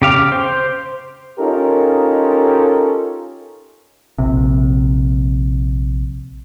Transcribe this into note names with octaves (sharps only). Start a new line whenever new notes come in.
C#3 G4 F5 D6
C5
C#4 D#4 F4 G4 A4 A#4
A#1 C3